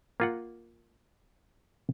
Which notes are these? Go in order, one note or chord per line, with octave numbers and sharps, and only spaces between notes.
A#3 F4 F#5